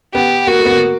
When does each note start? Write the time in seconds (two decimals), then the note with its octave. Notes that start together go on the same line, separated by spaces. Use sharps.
0.14 B3 G4
0.47 A#3 F#4
0.59 A3
0.66 B3
0.71 A#3